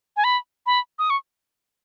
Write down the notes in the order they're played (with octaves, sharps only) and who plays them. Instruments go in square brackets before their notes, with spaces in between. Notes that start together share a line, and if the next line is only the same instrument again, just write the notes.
[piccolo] G#5
B5
B5
D#6
C#6